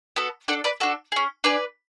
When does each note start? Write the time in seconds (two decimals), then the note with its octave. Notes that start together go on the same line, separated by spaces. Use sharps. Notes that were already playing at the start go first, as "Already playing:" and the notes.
0.16 B3 F#4 A4
0.48 D4 A4 D5 F#5
0.64 B4 D5
0.80 D4 F#4 A4
1.12 C#4 G#4
1.44 D4 G#4 B4 D5